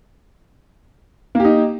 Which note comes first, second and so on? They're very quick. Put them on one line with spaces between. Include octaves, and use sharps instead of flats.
A#3 G4 D#4